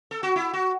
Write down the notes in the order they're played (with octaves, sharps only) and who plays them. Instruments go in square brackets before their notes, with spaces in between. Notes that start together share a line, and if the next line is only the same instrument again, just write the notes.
[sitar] A4
F#4
E4
F#4